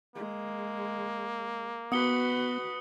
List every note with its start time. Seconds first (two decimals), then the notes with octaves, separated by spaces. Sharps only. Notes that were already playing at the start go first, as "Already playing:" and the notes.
0.16 G#3 A#3
1.92 B3 F#4 B4 D#6 C#7 G7